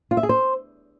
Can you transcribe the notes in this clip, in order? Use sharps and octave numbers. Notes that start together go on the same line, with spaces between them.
F4
E5
G#4
C5